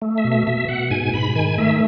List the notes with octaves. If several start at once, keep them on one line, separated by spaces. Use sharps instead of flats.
A3
E5
B2
E5
B2 E5
B2 F#5
G#2 G#5
G#2 B5
D#3 G#5
A3 E5